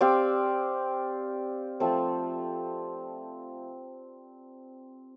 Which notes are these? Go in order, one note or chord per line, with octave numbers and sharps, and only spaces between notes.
C4 G4 D5 F5
F3 A3 C4